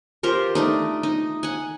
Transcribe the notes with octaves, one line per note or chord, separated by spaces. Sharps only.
F4 G4 A#4 C5
A3 D4 D#4
D#4
F#5 G#5